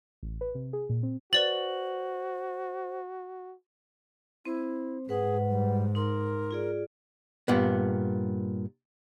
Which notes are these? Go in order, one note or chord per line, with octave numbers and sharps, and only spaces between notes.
A1
B4
C3
G#4
A#2
C4
F#4 B4 C5 D5 A6 F#7
C4 E4 C5
G#2 G#4 B4 F#5
G3
D#4 A#4 C6
F4 G#4 D5
G2 A#2 B3